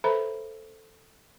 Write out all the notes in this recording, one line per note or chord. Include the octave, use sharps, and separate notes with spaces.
A4 B4 C5 E5 A#5 B5